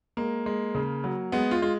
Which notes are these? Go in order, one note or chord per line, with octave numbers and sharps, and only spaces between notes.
G#3 A#3
G#3
C#3
F#3
G#3 B3
F4
G#3 F4